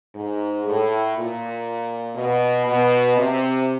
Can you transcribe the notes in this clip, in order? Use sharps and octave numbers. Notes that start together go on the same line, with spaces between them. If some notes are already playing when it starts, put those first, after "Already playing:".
G#2
A2
A#2
B2
B2
C3